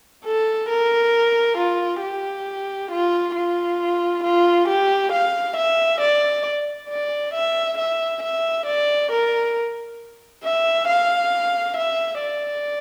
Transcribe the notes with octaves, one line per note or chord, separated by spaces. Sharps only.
A4
A#4
F4
G4
F4
F4
F4
G4
F5
E5
D5
D5
E5
E5
E5
D5
A#4
E5
F5
E5
D5